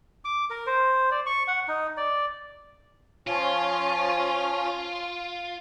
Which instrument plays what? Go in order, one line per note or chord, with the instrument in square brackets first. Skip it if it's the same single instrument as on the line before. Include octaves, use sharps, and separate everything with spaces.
[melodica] D6
A#4
C5
D5
C#6
F#5
D#4
D5
[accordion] F3 C#4 [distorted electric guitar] F4